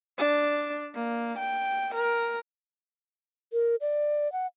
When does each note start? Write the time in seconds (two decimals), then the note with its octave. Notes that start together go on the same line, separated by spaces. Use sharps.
0.18 D4
0.95 A#3
1.39 G5
1.95 A#4
3.52 A#4
3.81 D5
4.32 F#5